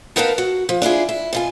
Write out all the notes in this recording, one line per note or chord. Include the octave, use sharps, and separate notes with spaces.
B3 D#4 A#4 B4 F5 A5
F#4
F3
D4 E4 F4 G#4
E4
B2 F4 G#5